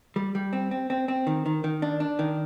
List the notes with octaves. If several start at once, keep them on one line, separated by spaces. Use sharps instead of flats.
G3
G3
C4
C4
C4
C4
D#3
D#3
D#3
D4
D4
D#3